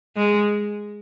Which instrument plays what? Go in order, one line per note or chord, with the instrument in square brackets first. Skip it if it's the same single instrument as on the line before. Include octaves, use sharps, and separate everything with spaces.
[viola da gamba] G#3